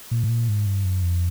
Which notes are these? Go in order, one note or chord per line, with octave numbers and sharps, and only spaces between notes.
A#2
A2
A#2
G#2
G2
F#2
F2